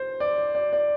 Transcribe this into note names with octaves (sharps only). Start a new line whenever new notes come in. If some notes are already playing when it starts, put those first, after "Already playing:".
Already playing: C5
D5
D5
D5